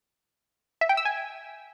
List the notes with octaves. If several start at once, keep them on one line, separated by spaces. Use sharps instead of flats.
E5
G5
E6
G#5